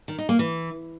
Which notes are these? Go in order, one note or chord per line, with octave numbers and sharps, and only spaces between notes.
D#3
D#4
A#3
E3